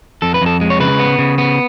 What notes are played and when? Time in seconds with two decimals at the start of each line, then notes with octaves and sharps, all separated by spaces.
0.22 F2 A4
0.34 B4
0.41 F2 A4
0.61 G#3
0.70 C#5
0.80 C#3 B4
0.99 B3
1.18 C#3
1.38 B3